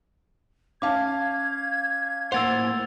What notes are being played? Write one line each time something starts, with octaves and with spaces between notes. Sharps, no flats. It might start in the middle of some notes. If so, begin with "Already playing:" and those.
C#4 F5 A5 D6 G#6
A2 A#3 C5 F#5 E6 A6 F7